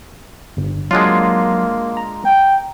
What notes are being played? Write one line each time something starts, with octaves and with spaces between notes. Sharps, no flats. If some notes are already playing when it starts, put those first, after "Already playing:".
G1
F#3 G#3 A#3 D4 F4
A#5
G5